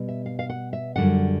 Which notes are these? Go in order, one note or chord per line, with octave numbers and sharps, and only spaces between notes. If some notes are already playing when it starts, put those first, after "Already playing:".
Already playing: B2 G3
E5
F5
F5
F#5
E5
F#2 D3 G3 F#5